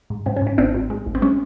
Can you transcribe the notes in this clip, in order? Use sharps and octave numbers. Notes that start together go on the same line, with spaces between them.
G#2
G#2 C4
C#4
G#2
C#4
G#1 C4 D4
G#1
G#3
A1
C4
G#3 C#4